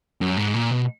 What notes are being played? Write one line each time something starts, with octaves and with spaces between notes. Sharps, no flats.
F#2
G#2
A#2
B2